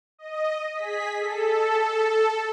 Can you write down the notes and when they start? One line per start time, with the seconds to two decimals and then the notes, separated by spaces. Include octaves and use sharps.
0.19 D#5
0.75 G#4 B6
1.19 A4